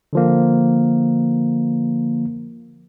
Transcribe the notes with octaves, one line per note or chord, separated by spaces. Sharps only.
D3 F3 A#3